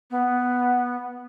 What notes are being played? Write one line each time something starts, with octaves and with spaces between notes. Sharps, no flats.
B3